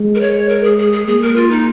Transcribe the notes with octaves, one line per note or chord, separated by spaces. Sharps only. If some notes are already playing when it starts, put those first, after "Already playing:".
Already playing: G#3
A#4
C#5
A#4
G#4
G#4
G#4
A#3 G#4
A#4
F4
D#4